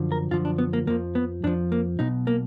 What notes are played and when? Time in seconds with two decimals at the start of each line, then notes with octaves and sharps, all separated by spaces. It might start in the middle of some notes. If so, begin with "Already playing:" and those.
Already playing: F#2 D3 F3
0.12 A#4
0.31 F#2 D3 F3 F4
0.45 D4
0.58 B3
0.73 A#3
0.87 F2 F3 A#3
1.15 B3
1.44 F2 F3 D4
1.72 A#3
1.99 B1 B2 D#4
2.27 A#3